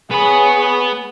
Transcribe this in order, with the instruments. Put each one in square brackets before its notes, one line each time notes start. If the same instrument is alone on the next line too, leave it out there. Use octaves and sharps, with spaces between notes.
[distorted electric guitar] B3 B5 [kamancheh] G#4 C#5